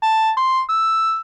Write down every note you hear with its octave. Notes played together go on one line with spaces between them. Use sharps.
A5
C6
E6